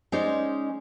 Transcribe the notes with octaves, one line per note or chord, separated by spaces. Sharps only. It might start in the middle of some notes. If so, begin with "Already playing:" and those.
G#3 C#4 D#4 C5 D5